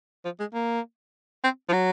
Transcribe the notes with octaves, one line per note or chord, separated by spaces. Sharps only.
F3
G#3
A#3
C4
F3
F#3